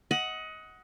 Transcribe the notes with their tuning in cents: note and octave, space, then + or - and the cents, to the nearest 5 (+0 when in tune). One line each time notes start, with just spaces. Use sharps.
D#5 +25 F#5 +0